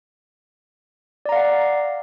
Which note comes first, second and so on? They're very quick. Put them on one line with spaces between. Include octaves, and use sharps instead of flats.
D5 A#5 F5 F#5